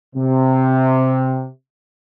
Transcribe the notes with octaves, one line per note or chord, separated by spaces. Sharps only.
C3